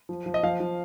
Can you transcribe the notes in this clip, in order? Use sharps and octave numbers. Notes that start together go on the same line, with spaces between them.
F3
F3
D#5
F3 F5
F3